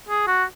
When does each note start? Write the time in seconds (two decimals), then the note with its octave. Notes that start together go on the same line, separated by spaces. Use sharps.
0.08 G#4
0.27 F#4